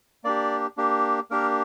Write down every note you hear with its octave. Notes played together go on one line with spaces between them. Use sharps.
A#3 D4 G4 D5
A#3 D4 G4
A#3 D4 G4 A#4